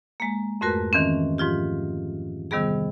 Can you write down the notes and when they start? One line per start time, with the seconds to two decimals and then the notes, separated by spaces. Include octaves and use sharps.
0.20 G#3 A#3
0.61 F2 G#2 A3 F#4 A#4 B4
0.93 D#3 E3 C4 C#4
1.38 G#2 F3 F4 G4
2.51 C3 D#3 G3 B3 G#4